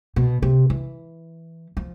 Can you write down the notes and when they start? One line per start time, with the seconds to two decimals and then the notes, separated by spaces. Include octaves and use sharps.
0.16 B2
0.43 C3
0.70 E3
1.77 F3